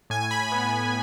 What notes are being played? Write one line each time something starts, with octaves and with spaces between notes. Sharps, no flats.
A2 G#5
B5
B3
B5